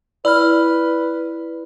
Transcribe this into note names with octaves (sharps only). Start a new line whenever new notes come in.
E4 B4 D5 B5 F6